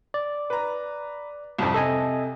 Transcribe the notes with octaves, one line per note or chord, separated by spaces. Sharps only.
D5
B4 A#5
C2 F2
C3 A4 D#5 G#5